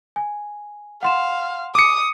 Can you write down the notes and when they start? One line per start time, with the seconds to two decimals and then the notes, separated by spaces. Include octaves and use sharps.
0.16 G#5
1.03 F5 F#5 C6 E7
1.75 D6 D#6 C#7